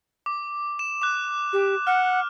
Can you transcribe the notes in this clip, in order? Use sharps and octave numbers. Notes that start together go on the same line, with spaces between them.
D6
E7
D6 F#6
G4
F#5 F6